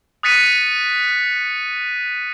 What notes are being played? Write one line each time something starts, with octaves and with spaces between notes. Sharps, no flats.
D#6 F#6 A6 B6 C#7 D#7